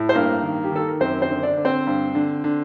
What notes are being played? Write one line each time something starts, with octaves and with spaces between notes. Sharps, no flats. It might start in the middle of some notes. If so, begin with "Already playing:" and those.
Already playing: A2
C5
G2 A#3 A#4
D#3
G4
D#3 A4
A#4
F#2 C4 C5
C4 C5
D3
D4 D5
D3
C4 C5
G2
D3
D3